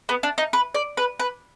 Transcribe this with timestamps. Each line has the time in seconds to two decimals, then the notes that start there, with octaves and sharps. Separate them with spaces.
0.09 B3
0.23 D4
0.38 D#4
0.53 B4
0.75 D5
0.97 B4
1.19 B4